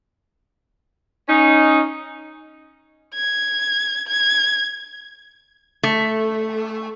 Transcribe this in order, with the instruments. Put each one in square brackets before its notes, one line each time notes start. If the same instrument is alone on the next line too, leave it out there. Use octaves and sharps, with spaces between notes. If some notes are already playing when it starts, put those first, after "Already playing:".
[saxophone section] C#4 D#4
[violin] G#6
G#6
[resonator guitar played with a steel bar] A3